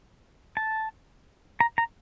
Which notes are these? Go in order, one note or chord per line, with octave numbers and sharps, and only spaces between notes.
A5
A#5
A#5